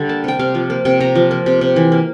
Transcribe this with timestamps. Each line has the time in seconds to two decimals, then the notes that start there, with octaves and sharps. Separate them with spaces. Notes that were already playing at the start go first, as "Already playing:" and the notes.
Already playing: D3 G3
0.09 A#3 A5
0.24 C3 G5
0.39 C3 F5
0.55 F3
0.70 A#3
0.85 C3 G5
1.00 C3 A#5
1.15 F3
1.31 A#3
1.46 C3
1.61 C3
1.76 E3
1.92 A#3